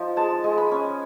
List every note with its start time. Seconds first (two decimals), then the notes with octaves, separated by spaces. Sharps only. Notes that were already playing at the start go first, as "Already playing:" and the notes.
Already playing: F3 D#4
0.16 G#3 A5
0.44 G#3
0.58 B5
0.71 C#4